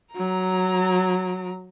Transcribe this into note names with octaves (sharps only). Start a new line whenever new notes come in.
F#3 A#5